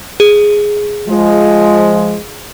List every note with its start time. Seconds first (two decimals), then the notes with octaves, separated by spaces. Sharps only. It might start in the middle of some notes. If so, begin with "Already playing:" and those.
0.20 G#4
1.07 F3 G#3